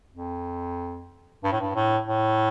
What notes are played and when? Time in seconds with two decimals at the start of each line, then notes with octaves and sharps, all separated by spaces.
0.15 F2
1.44 G2
1.52 A2
1.61 G2
1.75 A2
2.08 A2